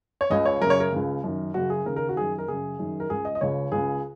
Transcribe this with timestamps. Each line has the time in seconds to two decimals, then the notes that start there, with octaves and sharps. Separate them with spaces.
0.21 C#5
0.30 C#2 C#3 D#5
0.46 C#5
0.61 F#2 C#3 A#4
0.70 C#5
0.80 A#4
0.92 C#2 C#3
1.24 F#2 D#3
1.54 F#2 C#3 F#4
1.70 G#4
1.85 D#2 C#3 A#4
1.96 A#4
2.09 F#4
2.16 F#2 D#3 G#4
2.38 A#4
2.48 F#2 C#3 G#4
2.79 F#2 D#3
3.00 A#4
3.10 C#2 C#3 G#4
3.25 D#5
3.35 D#5
3.41 C#2 C#3 C#5
3.72 C#2 C#3 G#4